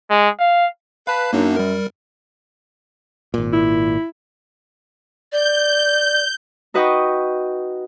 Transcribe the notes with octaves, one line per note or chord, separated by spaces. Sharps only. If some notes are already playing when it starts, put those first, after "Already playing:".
G#3
F5
B4 F5 A5
F#2 A#3 D4 D#4
G3 A#4
G#1 A#2
E4
D5 G6
D#4 F#4 B4 D#5 G5 C#6